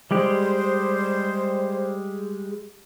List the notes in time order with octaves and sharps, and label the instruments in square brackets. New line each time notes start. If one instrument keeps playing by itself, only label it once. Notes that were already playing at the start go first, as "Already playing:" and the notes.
[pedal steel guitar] G3 G#3 G4 [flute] C5